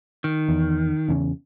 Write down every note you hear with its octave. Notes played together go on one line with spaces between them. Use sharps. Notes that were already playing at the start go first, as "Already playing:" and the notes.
D#3
E2
E2 C#3